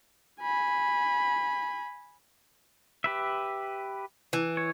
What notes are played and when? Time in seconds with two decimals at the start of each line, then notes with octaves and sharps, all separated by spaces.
0.41 G#5 B5
3.04 G4 B4 E5
4.33 E3
4.57 C#5